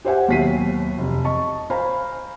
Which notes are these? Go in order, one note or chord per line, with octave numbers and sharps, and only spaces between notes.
G4 C5 E5 F#5 G#5
D#2 B2 F#3 B6 C7 D#7
F1
D#5 A5 C#6
C5 F5 G#5 A#5 B5